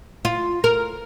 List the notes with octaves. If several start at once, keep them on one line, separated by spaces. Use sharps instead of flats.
F4
A#4